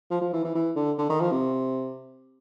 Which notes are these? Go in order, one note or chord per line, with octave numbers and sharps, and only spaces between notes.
F3
F3
E3
E3
E3
D3
D3
D#3
F3
C3